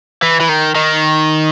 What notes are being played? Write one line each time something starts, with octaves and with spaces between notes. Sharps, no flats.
E3
E3
D#3
D#3